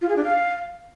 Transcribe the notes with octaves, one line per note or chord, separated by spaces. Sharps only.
F4
G#4
D4
F5